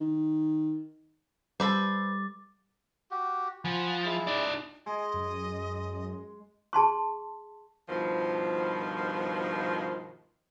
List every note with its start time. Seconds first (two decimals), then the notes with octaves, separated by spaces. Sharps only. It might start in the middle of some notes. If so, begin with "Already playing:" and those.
0.01 D#3
1.60 G3 A4 B4 C5 D6 A6
3.11 F#4 G4
3.65 F3 F#5 G#5 B5
4.05 G#3 E4
4.27 D#4 D5
4.86 G#3 D#5
5.14 F#2
6.73 G#4 A5 C6 C#6
7.88 G2 B2 D#3 F3